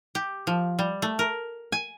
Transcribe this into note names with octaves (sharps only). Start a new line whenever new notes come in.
G4
F3
G3
A3
A#4
G#5